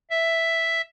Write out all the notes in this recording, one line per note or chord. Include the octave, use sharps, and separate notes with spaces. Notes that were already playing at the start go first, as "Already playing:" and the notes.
E5